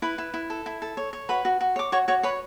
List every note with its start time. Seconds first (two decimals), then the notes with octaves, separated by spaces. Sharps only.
0.02 E4 B4 B5
0.18 E4
0.34 E4
0.50 A4
0.66 E4
0.82 A4
0.97 C#5
1.13 C#5
1.29 F#4 B4 B5
1.45 F#4
1.61 F#4
1.76 C#5 D6
1.92 F#4 C#5 C#6
2.08 F#4 C#5 C#6
2.23 B4 C#5 B5